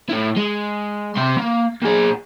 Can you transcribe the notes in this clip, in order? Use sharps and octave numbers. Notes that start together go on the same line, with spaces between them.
A2 E4
G#3
C3 C6
A#3
A#2 G#4